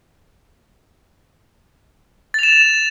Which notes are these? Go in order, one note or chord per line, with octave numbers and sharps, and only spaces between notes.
A6 E7 F7